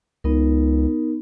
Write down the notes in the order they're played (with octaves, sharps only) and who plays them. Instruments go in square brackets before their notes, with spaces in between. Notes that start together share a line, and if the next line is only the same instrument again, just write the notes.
[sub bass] C#2 [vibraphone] B3 D#4 A#4